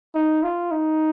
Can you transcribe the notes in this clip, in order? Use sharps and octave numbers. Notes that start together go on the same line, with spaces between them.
D#4
F4
D#4